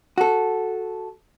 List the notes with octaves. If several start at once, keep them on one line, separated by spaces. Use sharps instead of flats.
F#4 A4